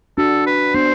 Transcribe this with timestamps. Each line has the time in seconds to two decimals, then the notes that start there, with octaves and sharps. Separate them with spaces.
0.18 D4 F#4 A4
0.46 B4
0.74 B3 D4 C5